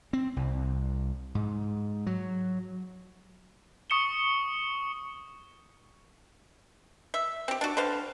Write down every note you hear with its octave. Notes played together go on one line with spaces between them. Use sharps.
C4
C2
G#2
F#3
C#6 D#6 C#7 E7 G7
E5
C4 G4
D4 F#4
D3 B4 C5 F5